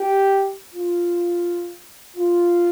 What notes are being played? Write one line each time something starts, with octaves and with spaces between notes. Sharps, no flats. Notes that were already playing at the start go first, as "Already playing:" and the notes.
Already playing: G4
F4
F4